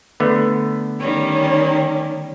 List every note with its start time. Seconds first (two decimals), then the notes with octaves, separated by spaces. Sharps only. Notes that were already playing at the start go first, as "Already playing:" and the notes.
0.20 D3 A3 B3
1.00 D#3 G3 C#4